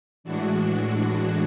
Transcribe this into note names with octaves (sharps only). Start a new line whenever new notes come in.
A2 E3 G#3 D4 F#4